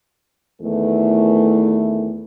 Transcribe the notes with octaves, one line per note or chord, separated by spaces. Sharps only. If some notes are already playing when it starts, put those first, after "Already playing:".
E2 D#3 E3 A3